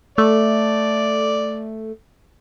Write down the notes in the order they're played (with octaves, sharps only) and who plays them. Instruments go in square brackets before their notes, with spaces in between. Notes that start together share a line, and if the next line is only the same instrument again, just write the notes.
[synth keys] A3 [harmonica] D5